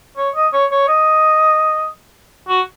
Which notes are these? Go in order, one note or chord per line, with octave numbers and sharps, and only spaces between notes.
C#5
D#5
C#5
C#5
D#5
F#4